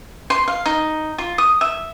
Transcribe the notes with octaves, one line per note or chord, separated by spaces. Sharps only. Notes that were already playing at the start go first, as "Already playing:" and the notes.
C6
F5
D#4
F4
D#6
E5